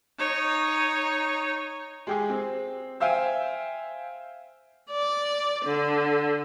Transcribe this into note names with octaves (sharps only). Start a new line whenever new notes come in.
D#4 C#5
G#3 G4 G#4
C4
C5 E5 F5 G5 G#5
D5
D3